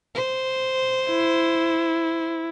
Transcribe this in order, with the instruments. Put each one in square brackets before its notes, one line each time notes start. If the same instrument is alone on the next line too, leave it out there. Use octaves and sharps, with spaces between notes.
[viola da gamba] C5
[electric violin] E4